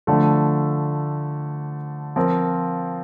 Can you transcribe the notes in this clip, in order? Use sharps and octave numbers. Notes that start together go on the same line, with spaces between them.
D3 F3 A3
F3 C4 F4 A#4